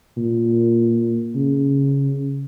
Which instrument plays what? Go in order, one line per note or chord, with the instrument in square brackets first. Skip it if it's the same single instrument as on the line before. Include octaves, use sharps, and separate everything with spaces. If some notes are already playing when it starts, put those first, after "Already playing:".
[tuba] A#2
C#3